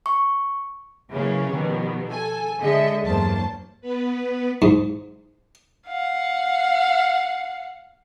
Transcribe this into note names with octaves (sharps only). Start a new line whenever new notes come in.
C#6
C#3 E3 F#3 G#3 A#3 C#4
B2 D#3 F3 G3 B3
A4 G#5
D3 G#3 D#5 E5 C#7
E2 G2 F#3 A#3 C5 A5
B3 B4
G#2
F5 F#5